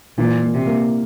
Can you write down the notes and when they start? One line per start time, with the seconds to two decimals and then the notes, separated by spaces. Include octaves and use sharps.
0.18 A#2 E3
0.42 A#3
0.54 C3
0.67 A#3